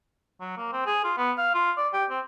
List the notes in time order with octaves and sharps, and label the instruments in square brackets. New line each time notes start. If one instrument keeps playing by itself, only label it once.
[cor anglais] F#3
A#3
C4
G#4
F4
B3
F5
F4
D5
G4
C4